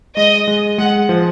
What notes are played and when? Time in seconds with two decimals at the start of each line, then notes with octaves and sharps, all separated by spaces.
0.17 G#3 D#5
0.48 G#3
0.78 G#3 F#5
1.09 F3